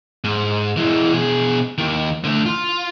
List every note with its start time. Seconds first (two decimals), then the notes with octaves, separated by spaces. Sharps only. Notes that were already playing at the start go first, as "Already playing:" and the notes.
0.24 G#2
0.77 E3 G#3
1.13 B2 G#4
1.78 D#2 D#3
2.24 D3 A3
2.46 F4